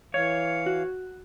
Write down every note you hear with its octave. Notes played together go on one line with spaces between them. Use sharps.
E3 C#5 F5
F#4